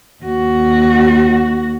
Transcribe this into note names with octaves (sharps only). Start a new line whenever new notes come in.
D#2 F#4